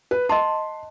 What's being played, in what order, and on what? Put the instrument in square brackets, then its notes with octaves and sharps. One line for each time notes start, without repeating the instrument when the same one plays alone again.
[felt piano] B4
[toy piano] D#5 A5 [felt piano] C6